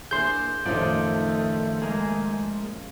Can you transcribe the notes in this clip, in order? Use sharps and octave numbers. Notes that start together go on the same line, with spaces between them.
A#3 D4 E4 G#4 C6 G6
A#1 F#2 D#3 F3 A3 D#4 D5
G#3 A#3 G#4